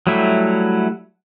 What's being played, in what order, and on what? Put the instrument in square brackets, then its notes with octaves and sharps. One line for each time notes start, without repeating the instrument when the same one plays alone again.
[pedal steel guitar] F#3 G3 A3 E4